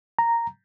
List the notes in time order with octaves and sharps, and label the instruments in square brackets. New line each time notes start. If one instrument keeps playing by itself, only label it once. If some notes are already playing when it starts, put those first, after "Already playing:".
[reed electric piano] A#5